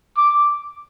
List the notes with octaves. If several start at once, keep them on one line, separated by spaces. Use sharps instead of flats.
D6